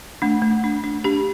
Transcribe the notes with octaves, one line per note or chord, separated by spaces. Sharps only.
A3 D4
A3
D4
D4
D4 G4